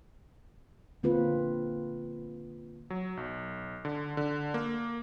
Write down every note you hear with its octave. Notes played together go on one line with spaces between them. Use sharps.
D3 A#3 C4 F4 B4
F#3
B1
D3
D3
A#3